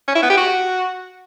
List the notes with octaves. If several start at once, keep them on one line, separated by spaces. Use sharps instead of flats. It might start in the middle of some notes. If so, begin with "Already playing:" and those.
C#4
E4
B3
G4
F#4